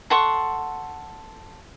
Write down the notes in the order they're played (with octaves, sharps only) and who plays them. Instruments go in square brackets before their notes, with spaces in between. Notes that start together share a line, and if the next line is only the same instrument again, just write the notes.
[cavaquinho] A4 F#5 C6 C#6